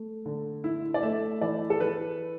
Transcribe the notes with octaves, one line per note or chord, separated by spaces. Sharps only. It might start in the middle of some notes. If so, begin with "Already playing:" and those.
Already playing: A3
D3
E4
D5
A3 E5
E3 D5
A4
E3 B4